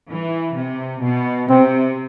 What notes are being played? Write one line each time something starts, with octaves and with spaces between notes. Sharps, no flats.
E3
C3
B2
C3 C4